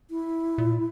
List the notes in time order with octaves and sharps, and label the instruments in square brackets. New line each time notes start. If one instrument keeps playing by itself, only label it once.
[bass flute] E4
[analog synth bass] A#2